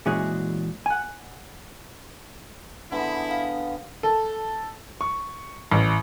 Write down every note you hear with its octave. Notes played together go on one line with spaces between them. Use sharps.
A#2 E3 G#3 C#4 F#4 G#4
F#5 G#5
D3 B3 E4 G#4
F5
A4
C#6
A1